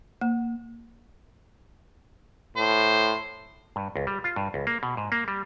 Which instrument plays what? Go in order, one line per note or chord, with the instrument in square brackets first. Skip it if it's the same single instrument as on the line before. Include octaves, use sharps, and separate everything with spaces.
[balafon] A#3
[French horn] A2 [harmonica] C5
[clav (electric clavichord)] G2
C#2
G3
F4
G2
C#2
A#3
B2
G#2
A#3
G3